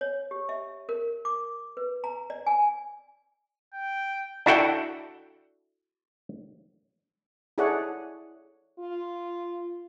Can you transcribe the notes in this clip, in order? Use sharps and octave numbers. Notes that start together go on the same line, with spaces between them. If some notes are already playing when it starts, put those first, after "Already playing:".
C#5
G4
E5
A#4
D6
B4
A#5
D5
G#5
G5
D4 E4 F#4 A4 F#5 G5
E4 G#4 A4 C#5 D5 F#5
F4